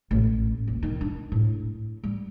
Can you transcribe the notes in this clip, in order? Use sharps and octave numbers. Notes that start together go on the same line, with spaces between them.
A1
D#1
D#3
D4
A2
G3